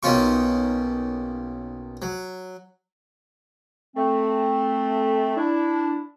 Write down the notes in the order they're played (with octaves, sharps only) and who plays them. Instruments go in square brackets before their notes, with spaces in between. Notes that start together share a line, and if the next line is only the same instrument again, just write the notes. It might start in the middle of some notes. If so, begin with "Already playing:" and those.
[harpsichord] B1 D#3 A#3 C#4 F4 C#6
F#3
[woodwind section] A3 C4
D4 E4